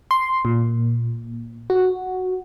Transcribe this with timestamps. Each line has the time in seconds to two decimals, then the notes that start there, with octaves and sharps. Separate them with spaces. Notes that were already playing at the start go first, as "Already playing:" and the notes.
0.11 C6
0.45 A#2
1.70 F#4